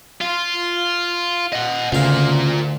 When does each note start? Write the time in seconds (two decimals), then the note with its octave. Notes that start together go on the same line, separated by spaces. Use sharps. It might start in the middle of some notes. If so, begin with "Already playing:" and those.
0.21 F4
1.53 D#5 F#5
1.92 D2 C#3 F4 A#4 F5